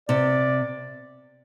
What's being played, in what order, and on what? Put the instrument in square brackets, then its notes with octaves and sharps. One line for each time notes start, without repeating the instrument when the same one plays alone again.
[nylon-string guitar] C3 [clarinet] D5